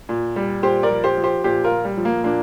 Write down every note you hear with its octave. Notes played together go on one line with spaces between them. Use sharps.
A#2
G3
A#2 G4 C5
A#4 D5
F3
G4 C5
F3
G4 C5
A#2 G4 C5
F4 A#4
A#2
G3
F3
A#3
A#2 A#3 D4